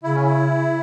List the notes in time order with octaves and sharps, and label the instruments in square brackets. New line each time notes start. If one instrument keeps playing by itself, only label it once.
[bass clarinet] C#3 [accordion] E4
[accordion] C#4
E4